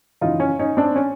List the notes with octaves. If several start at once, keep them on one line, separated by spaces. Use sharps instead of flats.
F#2 C#3 E3 D#4 F4
C#4
C#4 D#4
C4 D4
C#4